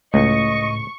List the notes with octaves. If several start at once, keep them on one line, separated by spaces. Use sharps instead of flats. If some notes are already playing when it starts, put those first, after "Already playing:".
C#2 A2 D#5 C#6